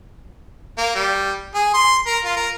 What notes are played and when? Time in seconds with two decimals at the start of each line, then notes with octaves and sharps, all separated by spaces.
0.78 A#3
0.95 G3
1.55 G#4
1.74 C6
2.06 A#4
2.25 F4
2.36 A#4